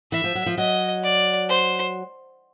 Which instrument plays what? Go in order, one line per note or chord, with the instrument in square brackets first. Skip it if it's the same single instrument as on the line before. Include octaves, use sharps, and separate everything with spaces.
[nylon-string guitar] E3 [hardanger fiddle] E5
[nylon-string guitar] F3
F#3
F3
[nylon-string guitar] F#3 [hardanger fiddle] D#5
[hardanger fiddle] D5
C5